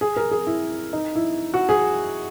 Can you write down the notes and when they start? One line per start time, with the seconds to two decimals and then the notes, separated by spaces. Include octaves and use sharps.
0.01 G#4
0.16 A#4
0.31 G#4
0.47 E4
0.93 D#4
1.15 E4
1.54 F#4
1.69 G#4